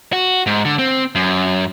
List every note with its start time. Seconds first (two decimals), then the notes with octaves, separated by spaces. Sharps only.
0.13 F#4
0.47 G#2
0.65 D3
0.79 C4
1.15 F#2